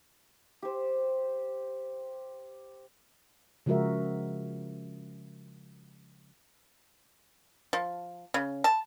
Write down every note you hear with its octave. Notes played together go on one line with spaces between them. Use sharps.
G4 C5
C#3 F3 G#3 F#4 A#4 E5
F3
C#3
A5